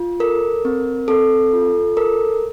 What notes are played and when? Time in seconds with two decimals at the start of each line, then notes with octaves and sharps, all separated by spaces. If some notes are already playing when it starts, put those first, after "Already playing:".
Already playing: F4
0.20 A4 A#4
0.65 C4
1.08 C4 A4
1.53 F4
1.97 A4 A#4